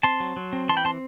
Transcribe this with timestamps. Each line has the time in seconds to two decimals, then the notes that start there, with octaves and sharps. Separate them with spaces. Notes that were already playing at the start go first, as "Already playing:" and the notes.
0.03 C4 A5 C6
0.20 F#3
0.36 F#3
0.53 C4
0.69 E3 A5 C6
0.77 G5 B5
0.85 C4 A5 C6